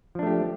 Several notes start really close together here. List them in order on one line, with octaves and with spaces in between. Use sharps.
F3 D4 A3 G4